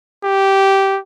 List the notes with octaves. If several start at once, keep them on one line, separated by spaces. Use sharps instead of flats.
G4